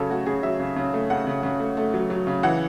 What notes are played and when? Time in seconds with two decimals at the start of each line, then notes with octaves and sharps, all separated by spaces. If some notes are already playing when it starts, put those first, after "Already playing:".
Already playing: C#3 F#3 A4 C#5
0.09 A3 F#4
0.26 C#3 G#4
0.43 F#3 E5
0.60 C#3
0.76 C#3
0.94 A3
1.10 C#3 F#5
1.27 C#3
1.43 C#3
1.60 A3
1.77 A3
1.94 F#3
2.10 F#3
2.27 C#3
2.43 E3 F#5